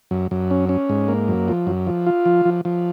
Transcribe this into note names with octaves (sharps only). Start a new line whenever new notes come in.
F#2
F#2
C#4
C#4
G#2
A#3
F#2
F3
F#2
F3
F4
F3
F3
F3